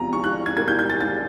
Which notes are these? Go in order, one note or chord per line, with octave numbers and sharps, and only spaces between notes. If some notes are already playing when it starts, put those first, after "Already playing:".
Already playing: E2 C3 F3 A#5
C#6
F#6
G#6
B2 G3 A#3 G#6
G6
G6
A6
A6